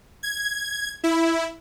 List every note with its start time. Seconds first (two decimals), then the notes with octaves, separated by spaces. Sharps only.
0.23 G#6
1.04 E4